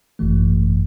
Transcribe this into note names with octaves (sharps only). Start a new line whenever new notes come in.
G#1 F#2 E3 A3